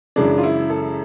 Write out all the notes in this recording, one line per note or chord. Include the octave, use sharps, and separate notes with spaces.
F#2 C#3 E3 G#3 D4
F4
E4
A4